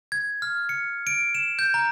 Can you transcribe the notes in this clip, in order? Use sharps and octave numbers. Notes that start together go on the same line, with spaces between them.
G#6
F6
C#7
D7
E7
G6
A#5